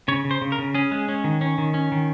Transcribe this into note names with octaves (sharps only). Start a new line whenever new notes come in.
C#3 C#5
C#3
C5
C#3
A#4
C#3
C#4 G#4
G#3
C#4
D#3
C#4
D#3
C#4
D#3